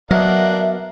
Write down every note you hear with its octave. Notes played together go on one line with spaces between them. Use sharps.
F#3 A#3 B3 D4 A#4 D#5 E5 F#5